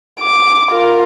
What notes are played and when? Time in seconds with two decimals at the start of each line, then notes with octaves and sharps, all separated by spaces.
0.21 D6
0.71 F4 A#4